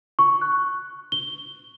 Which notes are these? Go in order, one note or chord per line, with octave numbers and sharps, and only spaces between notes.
C#6
F#6
G7